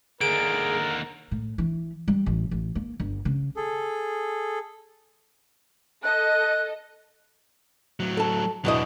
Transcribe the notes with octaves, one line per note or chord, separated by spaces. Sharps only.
D#2 D3 G#4 A#4 D7
A2
E3
G3
A1
A1
A#3
G1
C#3
G#4 A4
A4 D#5 F#6
A2 F#3
A4 A5
E2 B2 F#3 D4 D#5